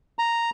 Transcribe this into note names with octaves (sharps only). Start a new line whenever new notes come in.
A#5